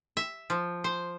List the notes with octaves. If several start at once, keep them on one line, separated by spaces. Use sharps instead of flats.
E5
F3
C5